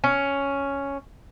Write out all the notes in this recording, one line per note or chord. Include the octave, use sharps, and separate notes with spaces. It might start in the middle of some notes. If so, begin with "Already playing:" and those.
C#4